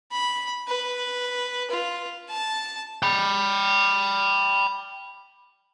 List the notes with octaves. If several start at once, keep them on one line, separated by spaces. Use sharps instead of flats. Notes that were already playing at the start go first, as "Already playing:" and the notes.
B5
B4
F4
A5
G5 B5